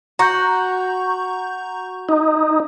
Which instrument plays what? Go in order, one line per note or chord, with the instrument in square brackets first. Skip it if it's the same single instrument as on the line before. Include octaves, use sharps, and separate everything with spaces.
[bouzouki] F#4 [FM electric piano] A#5 C#6 G6
[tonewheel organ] D#4